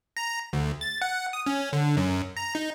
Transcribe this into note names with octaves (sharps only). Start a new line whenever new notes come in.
A#5
D2
A6
F#5
D#6
C#4
D3
F#2
A#5
D#4